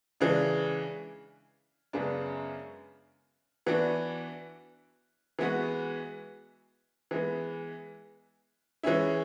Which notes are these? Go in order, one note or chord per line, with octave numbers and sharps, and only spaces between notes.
C#3 E3 G#3 D4
F#2 C#3 G#3 B3 D4
E3 B3 D4 F#4
E3 G#3 B3 F#4
E3 G#3 B3
E3 G#3 C#4 E4